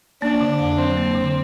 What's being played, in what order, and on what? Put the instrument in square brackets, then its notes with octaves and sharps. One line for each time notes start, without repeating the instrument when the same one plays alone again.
[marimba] A#3 [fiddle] D4
[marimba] D3
F2
[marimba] F#3 [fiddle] C4
[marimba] A#3
D3